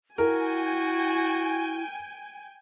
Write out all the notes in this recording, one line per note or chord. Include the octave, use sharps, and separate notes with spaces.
E4 F#4 A#4 G5 G#5